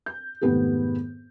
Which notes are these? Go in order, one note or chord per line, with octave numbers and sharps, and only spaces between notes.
G6
F1 G#2 D#3 B3 G4 G#4